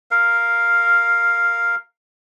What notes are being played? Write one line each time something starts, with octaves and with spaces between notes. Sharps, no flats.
A#4 F5